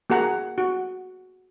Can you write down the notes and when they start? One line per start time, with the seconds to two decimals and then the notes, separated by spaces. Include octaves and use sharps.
0.10 A#3 F#4 G#4 F#5 A#5
0.58 F#4